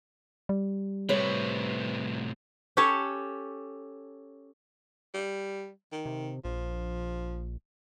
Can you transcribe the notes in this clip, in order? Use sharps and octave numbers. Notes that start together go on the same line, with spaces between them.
G3
A2 C3 B4 C#5
C#4 G4 A4 C#5 A5
G3
D#3
C3
A#1 F3